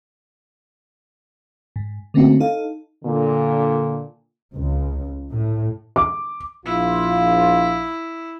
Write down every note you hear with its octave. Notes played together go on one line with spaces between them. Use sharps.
G#2
D3 A3 A#3 C4 C#4 F#4
D#4 A4 F5
A#2 D3
C#2
A2
D6
A#1 E4 F4